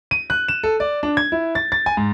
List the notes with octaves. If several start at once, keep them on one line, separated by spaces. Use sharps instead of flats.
D#7
F#6
E7
A4
D5
D4
G#6
E4
A6
A6
G#5
G#2